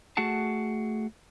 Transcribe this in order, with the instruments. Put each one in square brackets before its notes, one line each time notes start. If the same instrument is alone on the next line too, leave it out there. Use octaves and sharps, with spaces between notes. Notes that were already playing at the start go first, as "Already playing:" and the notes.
[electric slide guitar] A3 F#4 G#4 F#5 A5